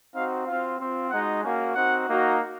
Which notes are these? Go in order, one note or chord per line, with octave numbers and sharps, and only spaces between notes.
C4 D#4 F#4 F5
C4 F4 F5
C4 F4
G#3 D#4 F#4 F#5
A#3 C#4 F#4 G#5
C4 D#4 F#4 F#5
A#3 D#4 F#4